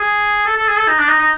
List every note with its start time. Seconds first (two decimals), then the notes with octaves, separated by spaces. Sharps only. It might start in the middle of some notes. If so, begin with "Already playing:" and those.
Already playing: G#4
0.46 A4
0.57 A4
0.68 G#4
0.78 A4
0.88 D#4
0.99 D4
1.09 D#4
1.19 D#4